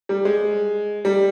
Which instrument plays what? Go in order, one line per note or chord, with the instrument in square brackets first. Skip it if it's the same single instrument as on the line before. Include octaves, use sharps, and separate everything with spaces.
[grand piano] G3
G#3
G3